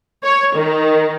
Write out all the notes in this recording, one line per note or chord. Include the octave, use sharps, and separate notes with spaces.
C#5
D#3